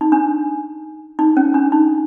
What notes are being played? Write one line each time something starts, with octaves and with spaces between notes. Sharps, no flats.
D#4
D4
D#4
C#4
D4
D#4